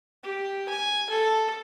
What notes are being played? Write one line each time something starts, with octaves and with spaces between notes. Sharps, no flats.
G4
G#5
A4